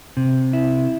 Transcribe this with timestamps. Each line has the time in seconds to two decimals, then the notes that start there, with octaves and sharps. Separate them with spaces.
0.17 C3
0.53 E4